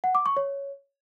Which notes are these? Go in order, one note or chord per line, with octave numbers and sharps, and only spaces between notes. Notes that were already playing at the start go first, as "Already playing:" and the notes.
F#5
D6
C#6
C#5